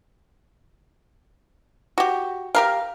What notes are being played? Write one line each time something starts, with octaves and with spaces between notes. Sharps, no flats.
F#4 G4
G4 A#4 F5